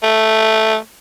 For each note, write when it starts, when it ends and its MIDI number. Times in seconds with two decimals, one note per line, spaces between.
0.03 0.77 57